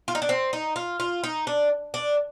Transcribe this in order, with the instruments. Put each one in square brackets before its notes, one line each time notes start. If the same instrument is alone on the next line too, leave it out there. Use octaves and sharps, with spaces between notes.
[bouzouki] F4
D#4
D4
C4
D#4
F4
F4
D#4
D4
D4